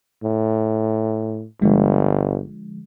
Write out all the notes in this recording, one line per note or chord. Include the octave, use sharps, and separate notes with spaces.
A2
G1 D3 F3 G#3